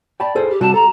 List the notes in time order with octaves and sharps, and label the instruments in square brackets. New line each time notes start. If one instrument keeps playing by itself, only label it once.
[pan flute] D5 [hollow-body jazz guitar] G5 A5 B5
[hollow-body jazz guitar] G#4 A4 C5
[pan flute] G4
[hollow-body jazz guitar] C3 G3 F#4 [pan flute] A5
[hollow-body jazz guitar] A4 [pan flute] A#5